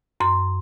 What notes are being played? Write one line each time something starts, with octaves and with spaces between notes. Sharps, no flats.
F#2 C6